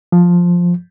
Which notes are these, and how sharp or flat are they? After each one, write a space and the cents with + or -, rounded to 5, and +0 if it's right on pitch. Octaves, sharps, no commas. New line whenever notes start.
F3 +5